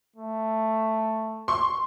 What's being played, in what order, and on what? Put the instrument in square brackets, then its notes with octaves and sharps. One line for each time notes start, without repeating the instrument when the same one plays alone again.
[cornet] A3
[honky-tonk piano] C6 C#6